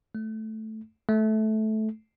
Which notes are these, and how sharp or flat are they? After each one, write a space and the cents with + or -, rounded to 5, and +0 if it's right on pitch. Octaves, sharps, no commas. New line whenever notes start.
A3 -5
A3 -15